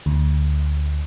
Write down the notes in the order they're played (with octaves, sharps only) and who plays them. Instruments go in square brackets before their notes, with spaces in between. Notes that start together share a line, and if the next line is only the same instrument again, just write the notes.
[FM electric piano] D2